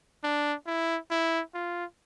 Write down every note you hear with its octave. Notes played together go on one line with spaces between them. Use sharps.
D4
E4
E4
F4